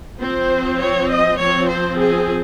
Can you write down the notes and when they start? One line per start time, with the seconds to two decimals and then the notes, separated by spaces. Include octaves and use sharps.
0.19 F3 C4 C5
0.79 C#5
1.10 D#5
1.39 F3 C4 C#5
1.69 C5
2.00 G#4